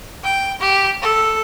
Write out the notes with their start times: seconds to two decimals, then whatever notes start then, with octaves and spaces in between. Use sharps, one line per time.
0.24 G5
0.61 G4
1.02 A4